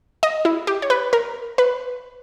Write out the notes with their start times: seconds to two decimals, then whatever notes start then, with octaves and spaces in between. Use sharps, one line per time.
0.23 D#5
0.45 E4
0.67 G4
0.82 C#5
0.90 B4
1.13 A#4
1.58 B4